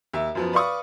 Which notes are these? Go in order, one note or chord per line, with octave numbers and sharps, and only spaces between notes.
D#2 E5
F#2 F3 B3
B4 D5 F5 C#6 D#6